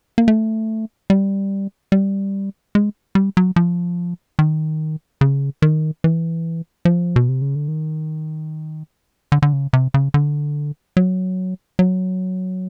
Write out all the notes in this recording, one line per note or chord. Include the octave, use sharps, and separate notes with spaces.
A#3
A3
G3
G3
G#3
G3
F#3
F3
D#3
C#3
D#3
E3
F3
B2
C3
C#3
D3
D#3
D3
D3
C#3
C3
C#3
D3
F#3
F#3